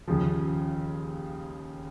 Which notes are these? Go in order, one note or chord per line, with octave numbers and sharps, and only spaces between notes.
D#2 C#3 F3